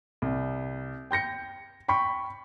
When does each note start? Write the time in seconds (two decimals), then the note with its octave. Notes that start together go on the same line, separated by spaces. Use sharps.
0.22 C2
1.11 G5 G6 A#6 C#7
1.88 G5 B5 C#6 B6